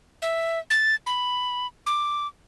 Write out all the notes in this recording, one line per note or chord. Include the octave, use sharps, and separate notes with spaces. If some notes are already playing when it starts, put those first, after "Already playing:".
E5
A6
B5
D6